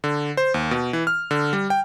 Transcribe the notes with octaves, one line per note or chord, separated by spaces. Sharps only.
D3
C5
D#2
B2
E3
F6
D3
G3
G5